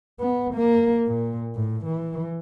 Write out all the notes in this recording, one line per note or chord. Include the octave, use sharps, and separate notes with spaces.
B3
A#3
A#2
A2
E3